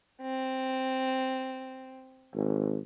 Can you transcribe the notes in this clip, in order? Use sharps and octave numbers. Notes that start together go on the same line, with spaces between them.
C4
G#1